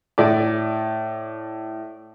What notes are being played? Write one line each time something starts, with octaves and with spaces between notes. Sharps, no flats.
A2 D5